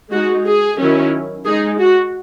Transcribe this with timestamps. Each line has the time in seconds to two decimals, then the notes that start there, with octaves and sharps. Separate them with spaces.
0.11 G#3 D#4 F#4
0.45 G#4
0.78 D#3 F#3 C#4 E4
1.46 G#3 D#4 G#4
1.79 F#4